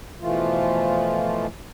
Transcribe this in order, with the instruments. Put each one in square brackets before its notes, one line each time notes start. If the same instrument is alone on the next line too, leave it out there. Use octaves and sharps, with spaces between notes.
[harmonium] B2 E3 F3 A3 F4